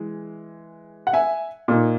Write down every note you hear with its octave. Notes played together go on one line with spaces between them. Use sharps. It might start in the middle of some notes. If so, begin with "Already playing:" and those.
Already playing: E3 G#3
F#5
E5 G#5
A#2 A#3 D#4